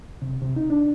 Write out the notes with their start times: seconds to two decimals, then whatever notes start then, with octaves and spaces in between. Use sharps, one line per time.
0.22 C3
0.42 C3
0.56 D#4
0.70 D4